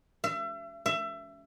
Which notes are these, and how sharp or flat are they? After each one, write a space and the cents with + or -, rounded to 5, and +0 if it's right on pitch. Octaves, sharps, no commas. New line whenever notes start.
E5 +35
E5 +25